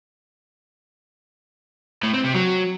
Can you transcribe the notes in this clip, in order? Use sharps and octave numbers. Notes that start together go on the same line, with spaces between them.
A2
C4
C3
F#3